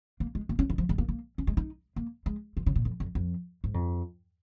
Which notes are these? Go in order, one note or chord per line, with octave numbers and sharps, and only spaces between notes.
A#3
G#3
A#3
C#4
D#3
F3
G#3
A#3
A#3
C#4
G#3
D#4
A#3
G#3
F3
C#3
A#2
F2
F2
F2
G#2
F2